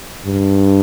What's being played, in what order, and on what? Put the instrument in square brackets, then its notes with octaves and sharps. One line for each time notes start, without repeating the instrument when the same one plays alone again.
[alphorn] G2